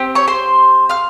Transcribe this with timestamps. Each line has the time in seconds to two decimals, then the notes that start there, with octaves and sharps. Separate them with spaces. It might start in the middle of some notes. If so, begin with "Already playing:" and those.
Already playing: C4 G4
0.15 C#5 C#6
0.28 C5 C6
0.89 F5 F6